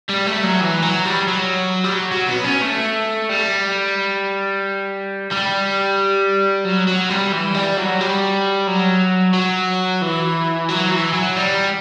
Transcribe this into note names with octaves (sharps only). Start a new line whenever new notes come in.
G3
A3
F#3
E3
F#3
G3
F#3
G3
F#3
F#3
B3
C#4
A3
G3
G3
F#3
F#3
G3
E3
G3
F#3
G3
F#3
F#3
E3
F#3
E3
F#3
G3